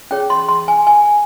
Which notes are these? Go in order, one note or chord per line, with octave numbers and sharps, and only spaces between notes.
C#4 G#4 C#5 G5
C6
C6
G#5
G#5